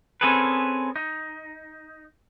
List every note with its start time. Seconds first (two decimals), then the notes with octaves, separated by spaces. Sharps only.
0.21 C4 C#4 G#4 A4 B4
0.96 D#4